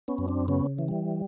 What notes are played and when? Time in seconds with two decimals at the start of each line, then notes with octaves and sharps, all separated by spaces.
0.08 B3 C#4
0.18 F#2
0.28 C4 D4
0.48 C#3 B3 C#4
0.79 E3
0.88 G3